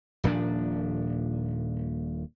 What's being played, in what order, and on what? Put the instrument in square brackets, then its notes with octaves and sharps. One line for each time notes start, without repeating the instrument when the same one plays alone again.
[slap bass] D#1 A#2 F3 D4